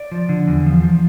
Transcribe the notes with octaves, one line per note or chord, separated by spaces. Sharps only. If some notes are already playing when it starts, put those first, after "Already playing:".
Already playing: D5
F3
D3
E2
F3
F3